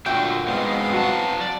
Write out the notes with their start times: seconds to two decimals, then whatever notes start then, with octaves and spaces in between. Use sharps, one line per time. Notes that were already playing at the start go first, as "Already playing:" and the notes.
0.06 A#2 D3 F#3 A3 F#4 E5 G5
0.47 G#2 B2 G#3 B3 C4 F5
0.93 F#3 F#4 A5
1.41 D5